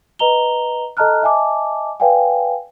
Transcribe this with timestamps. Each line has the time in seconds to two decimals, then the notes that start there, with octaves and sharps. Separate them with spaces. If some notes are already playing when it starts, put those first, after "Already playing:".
0.19 B4 D#5 A#5 F7 G7
0.97 A4 D#5 A5 A#5 F6 F#6
1.22 D#5 E5 G#5 A5 D6
2.00 B4 D5 F5 G5 G#5